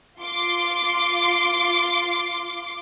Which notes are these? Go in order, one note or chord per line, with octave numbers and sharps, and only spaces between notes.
F4 C6 D6